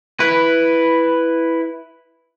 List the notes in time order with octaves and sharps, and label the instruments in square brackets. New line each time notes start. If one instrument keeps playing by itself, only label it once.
[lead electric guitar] E4 B4